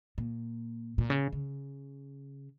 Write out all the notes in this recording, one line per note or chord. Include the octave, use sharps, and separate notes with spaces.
A#2
A#2
C#3
C#3